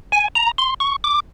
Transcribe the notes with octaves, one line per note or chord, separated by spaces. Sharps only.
G#5
A#5
C6
C#6
D6